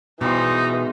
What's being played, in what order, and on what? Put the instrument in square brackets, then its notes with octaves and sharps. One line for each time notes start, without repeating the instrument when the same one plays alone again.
[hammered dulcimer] G#2 G3 C6 [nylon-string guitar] B2 [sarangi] E3 [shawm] D#4